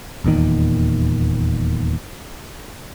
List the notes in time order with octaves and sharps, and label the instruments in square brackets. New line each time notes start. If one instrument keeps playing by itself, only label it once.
[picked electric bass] D#1 E2 A#2 D#3